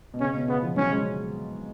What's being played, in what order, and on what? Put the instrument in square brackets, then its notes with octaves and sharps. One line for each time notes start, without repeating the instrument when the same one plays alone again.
[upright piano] B2
[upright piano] C#3 [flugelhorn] C#4
[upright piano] B2
[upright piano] C#3 [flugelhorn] B3
[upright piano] F3
[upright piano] F#3 [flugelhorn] C#4
[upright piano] G#3